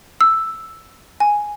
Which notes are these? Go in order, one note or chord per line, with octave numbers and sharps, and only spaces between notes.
E6
G#5